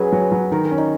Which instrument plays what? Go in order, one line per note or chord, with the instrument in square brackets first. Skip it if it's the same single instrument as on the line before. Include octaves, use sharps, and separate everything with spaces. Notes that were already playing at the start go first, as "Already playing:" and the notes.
Already playing: [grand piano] F#3 C#4 [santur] G#4 B4
[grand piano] F#3
F#3
[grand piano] D#3 [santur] A#4
[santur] A#4
[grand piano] C#4
[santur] D#4